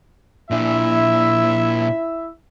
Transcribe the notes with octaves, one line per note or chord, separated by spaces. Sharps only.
A#2 D4 E4 E5